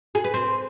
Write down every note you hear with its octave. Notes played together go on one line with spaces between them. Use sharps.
G#4
B4
C4